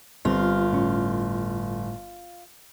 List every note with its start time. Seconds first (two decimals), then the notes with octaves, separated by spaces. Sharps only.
0.25 G1 G3 C4 F4
0.72 A2 C#4